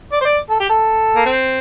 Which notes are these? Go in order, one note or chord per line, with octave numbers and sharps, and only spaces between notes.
D5
C5
D5
A4
G4
A4
A#3
C4